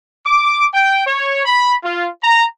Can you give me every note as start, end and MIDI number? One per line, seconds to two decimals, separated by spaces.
0.24 0.64 86
0.73 1.01 79
1.05 1.44 73
1.44 1.73 83
1.82 2.06 65
2.22 2.44 82